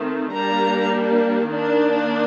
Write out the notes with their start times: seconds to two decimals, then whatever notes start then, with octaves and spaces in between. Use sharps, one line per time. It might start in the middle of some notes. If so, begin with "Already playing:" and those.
Already playing: D#3 A3 C4
0.33 G3 A#3 D4 A#5
1.48 D#3 A#3 D4